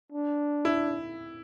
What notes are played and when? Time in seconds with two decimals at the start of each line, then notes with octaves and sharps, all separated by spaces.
0.12 D4
0.65 E4